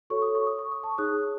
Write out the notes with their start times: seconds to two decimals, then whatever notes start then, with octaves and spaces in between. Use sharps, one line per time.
0.10 F#4 A4 C#5 C#6
0.22 D#6
0.35 C#6
0.47 D#6
0.59 C#6
0.72 D#6
0.83 A5 C#6
0.98 D#4 G#4 C#5 D#6 F#6